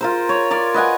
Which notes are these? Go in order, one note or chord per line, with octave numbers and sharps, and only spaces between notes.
F4 A#4 C5
C#5
A#4 C#5 D5
B4 D#5 F#5 G#5